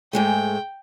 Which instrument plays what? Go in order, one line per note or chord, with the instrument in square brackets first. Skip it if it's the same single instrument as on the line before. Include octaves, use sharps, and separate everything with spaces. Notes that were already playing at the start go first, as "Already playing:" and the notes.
[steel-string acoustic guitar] G#2 G#3 A3 [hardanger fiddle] G5